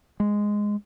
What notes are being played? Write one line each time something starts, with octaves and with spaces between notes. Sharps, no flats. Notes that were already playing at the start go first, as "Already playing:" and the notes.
G#3